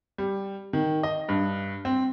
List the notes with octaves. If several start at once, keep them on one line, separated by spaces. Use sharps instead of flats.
G3
D#3
D#5
G2
C4